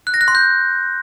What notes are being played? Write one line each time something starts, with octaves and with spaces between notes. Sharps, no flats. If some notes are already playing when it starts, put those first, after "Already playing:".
F#6
A#6
F#6
C6
G6